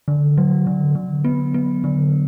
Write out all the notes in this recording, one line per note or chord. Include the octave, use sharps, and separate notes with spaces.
D3
F#3
D3
D3
B3
B3
D3